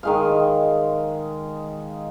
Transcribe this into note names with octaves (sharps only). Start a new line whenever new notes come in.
D#3 G#3 F5